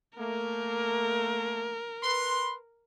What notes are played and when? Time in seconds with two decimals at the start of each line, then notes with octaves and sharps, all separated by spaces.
0.19 A3 A#3 A#4
2.04 B4 C6